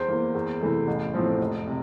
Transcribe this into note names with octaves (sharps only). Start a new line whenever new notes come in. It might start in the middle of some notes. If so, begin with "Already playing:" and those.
Already playing: E2 C5
E3 A#3
E2
C3 E3 A3
A1
A2 F3 C4
F1
C3